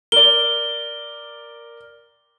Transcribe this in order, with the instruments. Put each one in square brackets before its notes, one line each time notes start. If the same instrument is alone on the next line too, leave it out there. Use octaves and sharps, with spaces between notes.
[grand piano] A#4 D5 [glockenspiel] G7